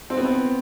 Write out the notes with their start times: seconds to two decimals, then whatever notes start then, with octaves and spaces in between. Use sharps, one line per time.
0.10 C4
0.17 B3
0.25 C4